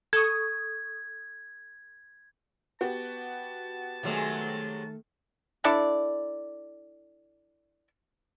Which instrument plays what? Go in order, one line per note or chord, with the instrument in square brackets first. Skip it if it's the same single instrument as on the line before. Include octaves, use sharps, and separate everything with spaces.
[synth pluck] A4 C#6 D#6 [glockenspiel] G#6
[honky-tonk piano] B3 F#4 G4 [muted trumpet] A5
[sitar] C3 F#3 G#3 [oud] D#3 A3 G#4
[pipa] D4 E4 A4 D5